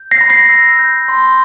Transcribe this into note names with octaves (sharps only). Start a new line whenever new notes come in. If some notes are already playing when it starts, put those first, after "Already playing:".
Already playing: G6
A#6 C7
B5
A#6 C7
E6
G6
C6